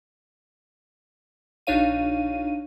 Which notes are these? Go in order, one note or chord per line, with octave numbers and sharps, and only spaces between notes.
A#1 D4 D#4 C#5 F5 D#7